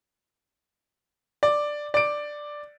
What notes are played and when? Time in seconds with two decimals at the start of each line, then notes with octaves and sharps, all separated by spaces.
1.43 D5
1.94 D5 D7